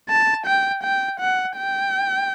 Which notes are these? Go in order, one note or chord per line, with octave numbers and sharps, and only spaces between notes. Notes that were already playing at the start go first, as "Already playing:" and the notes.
A5
G5
G5
F#5
G5